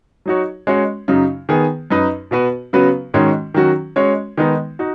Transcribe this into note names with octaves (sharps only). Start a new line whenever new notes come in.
F#3 D#4 F#4 C#5
G#3 C#4 F#4 C#5
F#2 C#3 F#3 D#4
D#3 B3 G#4
F#2 F#3 D#4 B4
B2 B3 F#4 B4
C#3 F#3 B3 F#4 B4
G#2 D#3 G#3 C#4 F#4
D#3 F#3 C#4 F#4
G#3 C#4 F#4 C#5
D#3 G#3 B3 D#4
D#4 F#4